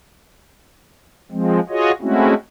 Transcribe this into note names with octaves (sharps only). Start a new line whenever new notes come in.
F3 G#3 C4
F4 F#4 G#4 C#5 D#5
G#3 A3 C4 C#4 E4 F#4